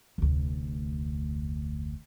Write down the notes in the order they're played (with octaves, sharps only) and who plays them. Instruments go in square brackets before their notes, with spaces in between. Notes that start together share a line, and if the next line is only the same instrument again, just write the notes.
[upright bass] F1 D2